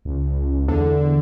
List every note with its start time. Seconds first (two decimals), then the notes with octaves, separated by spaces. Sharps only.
0.05 C#2
0.68 E2 D3